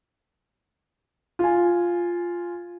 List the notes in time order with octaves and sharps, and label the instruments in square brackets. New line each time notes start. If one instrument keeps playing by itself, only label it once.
[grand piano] F4 G#5